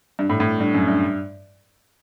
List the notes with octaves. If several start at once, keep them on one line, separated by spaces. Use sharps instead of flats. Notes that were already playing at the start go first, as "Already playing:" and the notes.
G2
A2
A2
G2
F#2
G2